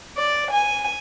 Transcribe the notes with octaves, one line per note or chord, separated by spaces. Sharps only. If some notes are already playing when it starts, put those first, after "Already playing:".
D5
G#5